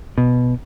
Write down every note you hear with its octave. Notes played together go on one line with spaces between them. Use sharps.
B2